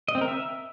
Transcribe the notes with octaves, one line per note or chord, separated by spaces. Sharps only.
D#5
C4
A#4
E5